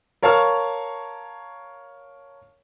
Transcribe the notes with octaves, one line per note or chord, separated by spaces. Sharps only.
A#4 C#5 F5 A5 C#6 F6